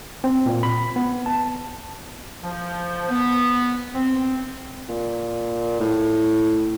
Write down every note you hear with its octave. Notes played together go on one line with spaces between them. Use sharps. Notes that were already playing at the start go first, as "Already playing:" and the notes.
C4
A#2
B5
B3
A5
F3
B3
C4
A#2
A2